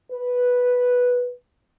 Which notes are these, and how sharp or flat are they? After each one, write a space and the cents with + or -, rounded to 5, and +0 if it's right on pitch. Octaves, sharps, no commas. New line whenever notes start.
B4 -5